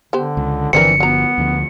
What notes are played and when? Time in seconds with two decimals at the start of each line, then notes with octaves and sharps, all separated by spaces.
0.13 D3 B3 G4 C5
0.37 C#2
0.73 G1 D3 E3 F3 C4 D4 A#4 C#7
1.00 F#3 B3 A#5
1.38 D2 D3 F3